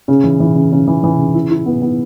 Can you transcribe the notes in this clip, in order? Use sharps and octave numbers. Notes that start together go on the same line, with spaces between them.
C#3
E3
E3
C#3
C#3
E3
E3
C#3
E4
E4
B3
B3